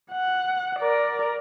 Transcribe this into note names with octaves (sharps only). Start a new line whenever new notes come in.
F#5
A#4 D5